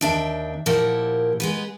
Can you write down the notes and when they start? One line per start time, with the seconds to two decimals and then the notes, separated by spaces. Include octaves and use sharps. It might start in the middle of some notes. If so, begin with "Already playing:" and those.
0.01 D#2 D4 E5 G5
0.66 A#2 F3 E4 G4 A#4 F#5
1.40 G#3 B3 B4